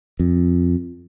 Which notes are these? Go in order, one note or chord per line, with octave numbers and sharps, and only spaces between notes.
F2